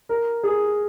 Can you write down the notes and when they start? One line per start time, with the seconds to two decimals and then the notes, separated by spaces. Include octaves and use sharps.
0.09 A#4
0.43 G#4